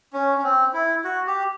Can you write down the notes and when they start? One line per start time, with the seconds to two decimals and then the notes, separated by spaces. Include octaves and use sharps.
0.13 C#4
0.38 C#4
0.43 C4
0.73 E4
1.04 F#4
1.27 G4